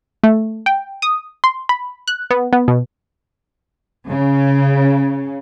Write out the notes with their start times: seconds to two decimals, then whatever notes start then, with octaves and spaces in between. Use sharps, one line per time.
0.24 A3
0.66 G5
1.02 D#6
1.44 C6
1.69 B5
2.08 F#6
2.31 B3
2.53 B3
2.68 B2
4.08 C#3